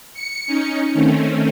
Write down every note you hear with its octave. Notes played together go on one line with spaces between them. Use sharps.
C#7
C#4 D#4
D#3 A3 C4 C#4